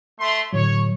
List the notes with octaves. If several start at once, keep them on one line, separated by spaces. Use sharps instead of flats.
A3 C6
A2 D3 F#3 C#5